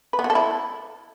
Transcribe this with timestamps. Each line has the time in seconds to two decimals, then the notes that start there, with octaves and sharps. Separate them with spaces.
0.13 B4
0.19 B3
0.24 F#4
0.30 A4
0.35 E4